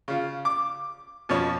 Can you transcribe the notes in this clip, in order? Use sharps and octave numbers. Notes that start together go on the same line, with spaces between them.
C#3 F4
D6
F2 B2 F3 C#4